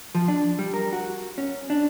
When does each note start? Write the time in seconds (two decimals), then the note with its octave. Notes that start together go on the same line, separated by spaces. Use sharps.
0.15 F3
0.28 D4
0.59 G3
0.74 A#4
0.93 F#4
1.38 C#4
1.70 D4